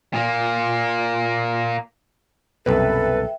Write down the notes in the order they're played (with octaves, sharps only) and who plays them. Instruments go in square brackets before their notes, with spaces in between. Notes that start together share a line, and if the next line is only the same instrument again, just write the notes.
[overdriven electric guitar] A#2 A#3
[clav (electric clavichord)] C2 F#2 B2 [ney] A4 [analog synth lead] B4 [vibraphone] E5 G5